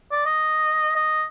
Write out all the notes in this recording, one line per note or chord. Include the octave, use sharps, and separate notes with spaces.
D5
D#5
D#5